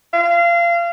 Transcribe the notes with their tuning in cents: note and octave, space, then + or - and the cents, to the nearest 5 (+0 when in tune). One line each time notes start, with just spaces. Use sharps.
F5 -25